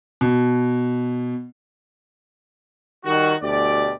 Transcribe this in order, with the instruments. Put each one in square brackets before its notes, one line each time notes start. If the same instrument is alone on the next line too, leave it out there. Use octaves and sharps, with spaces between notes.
[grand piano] B2
[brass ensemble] D#3 G3 F#4
D2 B2 G4 D5